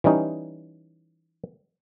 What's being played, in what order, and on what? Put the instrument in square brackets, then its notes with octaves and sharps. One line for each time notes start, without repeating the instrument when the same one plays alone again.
[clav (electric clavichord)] E3 G3 C#4 D#4